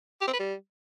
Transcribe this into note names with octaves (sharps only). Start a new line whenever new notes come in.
G4
C4
B4
G3